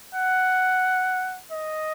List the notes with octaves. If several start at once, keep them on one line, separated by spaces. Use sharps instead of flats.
F#5
D#5